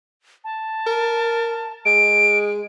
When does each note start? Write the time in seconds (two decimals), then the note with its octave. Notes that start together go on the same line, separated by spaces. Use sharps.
0.44 A5
0.87 A#4
1.85 G#3 D7